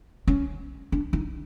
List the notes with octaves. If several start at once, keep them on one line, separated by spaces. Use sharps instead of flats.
C#4
D4
D#4